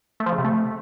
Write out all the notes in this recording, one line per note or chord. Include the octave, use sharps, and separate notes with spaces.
A3
F3
C#3
C3
A3